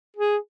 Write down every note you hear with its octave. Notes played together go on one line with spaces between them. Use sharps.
G#4